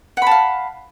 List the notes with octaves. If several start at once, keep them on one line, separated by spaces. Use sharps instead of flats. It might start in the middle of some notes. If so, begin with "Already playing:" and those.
F5 F#5 A5 B5